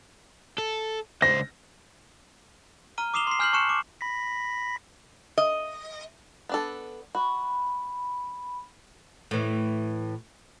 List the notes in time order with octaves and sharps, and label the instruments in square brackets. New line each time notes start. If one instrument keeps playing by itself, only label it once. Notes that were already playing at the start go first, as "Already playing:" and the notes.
[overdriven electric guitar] A4
[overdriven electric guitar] C#2 C5 [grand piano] A#6
[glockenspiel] A#5 F6 D#7 G7
D6 D#6 C7 E7 F7 G7
C6 C7
G#5 F6 G6 C7 F7 F#7
A5 C#6 F#6 C#7 E7
D6
[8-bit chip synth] B5 A#6 B6
[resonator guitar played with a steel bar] D#5
[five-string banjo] B3 D4 A4
[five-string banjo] F#4 [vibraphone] B5
[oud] A2 E3